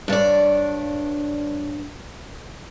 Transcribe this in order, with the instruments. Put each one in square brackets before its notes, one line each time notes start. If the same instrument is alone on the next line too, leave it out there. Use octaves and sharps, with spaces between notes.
[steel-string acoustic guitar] G2 D4 C#5 D5